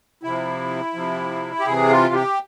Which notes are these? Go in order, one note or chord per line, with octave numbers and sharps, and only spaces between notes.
C3 F3 E4
C3 F3
G4
C3 E3 G#4
F4
G4